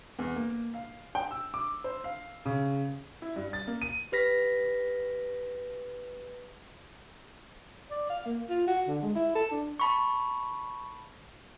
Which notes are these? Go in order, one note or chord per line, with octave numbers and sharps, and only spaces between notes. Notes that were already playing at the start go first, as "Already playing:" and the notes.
E2
A#3
F5
G5
E6
D6
C5
F5
C#3
E4
G2
A6
A#3
D#7
G4 B4 A#6 B6
D5
F5
A#3
F4
F#4
D3
G#3
E4
A4
D4
A5 B5 C#6